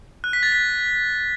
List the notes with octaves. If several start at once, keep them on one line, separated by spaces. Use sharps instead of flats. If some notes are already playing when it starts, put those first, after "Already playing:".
F#6
B6
A6
B6